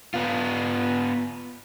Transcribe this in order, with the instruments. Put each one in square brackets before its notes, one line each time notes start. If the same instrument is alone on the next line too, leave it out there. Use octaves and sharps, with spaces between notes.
[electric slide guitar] B3 F4